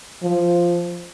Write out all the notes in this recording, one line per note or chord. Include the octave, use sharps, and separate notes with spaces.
F3